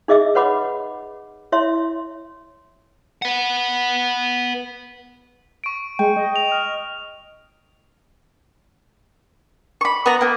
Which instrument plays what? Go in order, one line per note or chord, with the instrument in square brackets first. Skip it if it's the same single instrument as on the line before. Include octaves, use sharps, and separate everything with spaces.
[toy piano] D#4 G#4 D#5 E5 D6
B4 C#5 F#5 B5 D6
E4 C#5 E5 C6
[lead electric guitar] B4 F#5
[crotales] C#6 D7
[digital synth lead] G#3 [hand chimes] G5
[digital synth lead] D#5
[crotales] F7
F6
[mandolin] B5 C#6
B3 F#5 A#5
A#3 B3